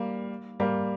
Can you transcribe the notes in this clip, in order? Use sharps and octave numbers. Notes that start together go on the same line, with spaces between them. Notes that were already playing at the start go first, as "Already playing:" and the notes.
Already playing: G3 A#3
G3 A#3